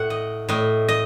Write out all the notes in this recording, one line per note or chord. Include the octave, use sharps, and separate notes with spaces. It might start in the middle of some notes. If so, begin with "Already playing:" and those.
Already playing: A2 F#5
D#5
A2 D#5
D#5